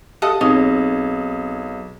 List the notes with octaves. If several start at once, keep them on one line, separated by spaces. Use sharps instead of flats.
G4 A4 D#5 F5 F#5
B1 C4 D#4 G#4 C#5 D#5